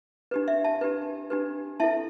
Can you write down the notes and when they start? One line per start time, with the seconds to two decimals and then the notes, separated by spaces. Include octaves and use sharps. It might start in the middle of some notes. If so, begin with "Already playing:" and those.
0.31 D4 G4 B4
0.48 E5
0.64 E5 A5
0.81 D4 G4 B4
1.30 D4 G4 B4
1.80 E4 A4 E5 A5